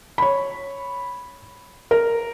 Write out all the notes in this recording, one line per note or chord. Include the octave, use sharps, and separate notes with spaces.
C#5 B5
A#4